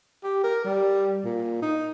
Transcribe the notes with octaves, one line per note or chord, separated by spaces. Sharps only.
G4
A#4
G3
A#2
D#4